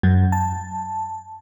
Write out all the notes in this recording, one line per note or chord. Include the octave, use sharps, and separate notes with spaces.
F#2
A5